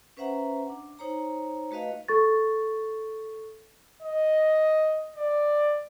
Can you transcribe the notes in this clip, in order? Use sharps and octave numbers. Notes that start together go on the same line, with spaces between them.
C#4 B4 C5 E5 F#5 A#5
D4
D#4 C5 C#5 A#5
A3 F#4 B4 D#5 F5
A4 C#6 A6
D#5
D5